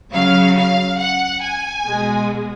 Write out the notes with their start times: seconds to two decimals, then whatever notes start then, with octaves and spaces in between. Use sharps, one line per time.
0.12 C#3 F#3 F5
0.56 F5
0.98 F#5
1.42 G#5
1.85 B2 G#3